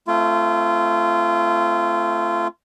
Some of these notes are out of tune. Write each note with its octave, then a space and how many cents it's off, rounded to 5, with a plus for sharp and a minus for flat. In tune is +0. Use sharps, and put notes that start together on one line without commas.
A3 +0 C4 -10 F4 -25